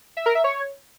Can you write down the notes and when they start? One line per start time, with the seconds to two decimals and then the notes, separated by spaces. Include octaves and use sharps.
0.17 E5
0.26 A#4
0.35 E5
0.44 C#5